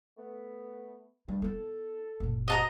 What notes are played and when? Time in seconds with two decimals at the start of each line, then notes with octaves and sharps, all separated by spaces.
0.18 A3 B3
1.28 G2 G3
1.42 B3 E4 A4
2.20 F#1 A#2
2.48 F#4 C5 D#5 A5 A#5